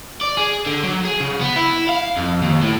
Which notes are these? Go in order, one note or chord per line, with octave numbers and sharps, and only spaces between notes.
D5
G#4
D3
F#3
G#4
C#3
B3
E4
F5
F2
D#2
A2